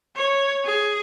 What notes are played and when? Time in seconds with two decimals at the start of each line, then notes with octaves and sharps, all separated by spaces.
0.16 C#5
0.65 G#4